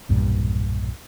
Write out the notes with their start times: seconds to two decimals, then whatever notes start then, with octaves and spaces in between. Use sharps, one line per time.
0.09 B1 E2 G2 A#2